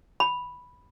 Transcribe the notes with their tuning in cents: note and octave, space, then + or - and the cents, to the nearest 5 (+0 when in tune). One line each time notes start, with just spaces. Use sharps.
B5 +0